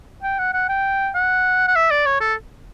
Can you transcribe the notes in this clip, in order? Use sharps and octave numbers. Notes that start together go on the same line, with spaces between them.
G5
F#5
F#5
G5
F#5
F#5
E5
D5
C#5
A4